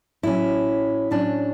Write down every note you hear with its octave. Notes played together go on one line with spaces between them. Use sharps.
A2 F#3 C#4 E4
A2 F#3 C#4 D4